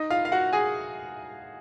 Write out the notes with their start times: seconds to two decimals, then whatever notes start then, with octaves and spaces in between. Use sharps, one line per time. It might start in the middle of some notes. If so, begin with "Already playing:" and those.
Already playing: D#4 D#5
0.10 F4 F5
0.25 F5
0.32 F#4 F#5
0.53 G#4 G#5